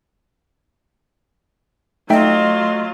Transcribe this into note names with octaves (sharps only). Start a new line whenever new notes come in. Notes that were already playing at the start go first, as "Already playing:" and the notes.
F#3 A3 D#4 F4 D#5 E5 G5